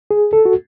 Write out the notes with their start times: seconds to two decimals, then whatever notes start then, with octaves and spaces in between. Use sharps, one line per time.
0.11 G#4
0.33 A4
0.45 F#4